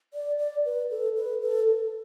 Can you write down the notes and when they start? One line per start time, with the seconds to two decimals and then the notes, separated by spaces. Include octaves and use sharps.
0.14 D5
0.39 D5
0.65 B4
0.91 A4
1.17 B4
1.42 A4